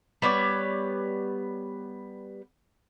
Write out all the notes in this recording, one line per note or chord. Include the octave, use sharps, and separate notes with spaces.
G3 B3 C#5 D5